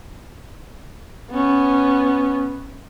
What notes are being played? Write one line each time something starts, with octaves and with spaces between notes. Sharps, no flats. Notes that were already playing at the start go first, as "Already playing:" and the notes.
B3 C#4